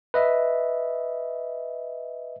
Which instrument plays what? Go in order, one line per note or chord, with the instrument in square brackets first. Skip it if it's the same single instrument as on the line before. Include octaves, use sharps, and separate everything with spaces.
[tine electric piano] B4 D#5 E5